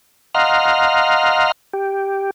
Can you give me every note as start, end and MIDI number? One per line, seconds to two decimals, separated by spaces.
0.35 1.52 75
0.35 1.52 77
0.35 1.52 78
0.35 1.52 82
0.35 1.52 84
0.35 1.52 89
1.73 2.31 67